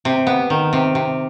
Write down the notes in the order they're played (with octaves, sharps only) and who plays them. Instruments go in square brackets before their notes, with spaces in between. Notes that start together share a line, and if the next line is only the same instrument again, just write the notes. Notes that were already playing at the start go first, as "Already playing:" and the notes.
[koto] C3
B3
D#3
C3
C3